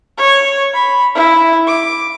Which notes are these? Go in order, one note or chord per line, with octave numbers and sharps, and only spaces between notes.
C#5
B5
E4
D6